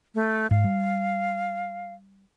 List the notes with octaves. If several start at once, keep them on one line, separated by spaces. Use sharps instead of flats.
A3
G#2 F5
G3